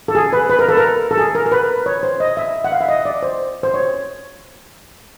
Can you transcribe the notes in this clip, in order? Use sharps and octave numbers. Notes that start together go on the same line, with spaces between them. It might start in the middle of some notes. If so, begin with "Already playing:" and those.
A4
G#4
B4
B4
A#4
A4
A#4
A4
G#4
A#4
A#4
B4
C#5
C5
D#5
E5
F#5
F5
E5
D#5
D5
C5
C5
C#5